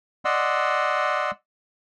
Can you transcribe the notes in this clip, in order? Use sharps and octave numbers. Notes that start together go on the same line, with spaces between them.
D5 D#5 F#5 C6 E6